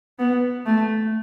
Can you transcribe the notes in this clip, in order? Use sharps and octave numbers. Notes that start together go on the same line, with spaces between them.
B3
A3